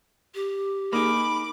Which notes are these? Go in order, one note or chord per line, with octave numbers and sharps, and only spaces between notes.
G4
A#3 D#4 G#4 B5 D6